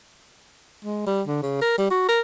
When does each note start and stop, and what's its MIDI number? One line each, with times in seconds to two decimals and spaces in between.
0.85 1.05 56
1.06 1.22 55
1.27 1.42 50
1.43 1.59 49
1.62 1.77 70
1.78 1.87 55
1.91 2.04 66
2.08 2.21 70